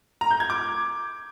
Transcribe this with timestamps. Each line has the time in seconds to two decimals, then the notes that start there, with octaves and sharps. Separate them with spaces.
0.21 A#5
0.31 G6
0.40 G#6
0.50 D6